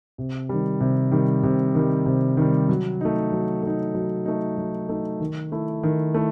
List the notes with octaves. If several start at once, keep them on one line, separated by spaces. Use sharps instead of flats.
C3
D#3 G3
C3
D#3 G3
C3
D#3 G3
C3
D#3 G3
F#3
A3 D#4
F#3
A3 D#4
F#3
A3 D#4
F#3
A3 D#4
D#3
A3 E4
D#3
A3 E4